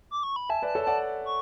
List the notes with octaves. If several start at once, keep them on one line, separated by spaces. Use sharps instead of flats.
D6
C#6
B5
E5 G#5 A5
B4 D5 A5
A4 C#5
D5 F#5 A5
C#6